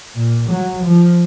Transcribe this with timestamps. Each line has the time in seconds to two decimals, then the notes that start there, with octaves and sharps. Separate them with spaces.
0.15 A#2
0.49 F#3
0.84 F3